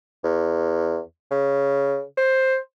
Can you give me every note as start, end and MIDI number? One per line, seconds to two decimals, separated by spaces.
0.24 0.99 40
1.31 2.02 49
2.17 2.57 72